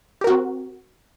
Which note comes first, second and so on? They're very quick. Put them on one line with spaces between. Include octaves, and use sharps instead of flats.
G4 A#4 F#4 C4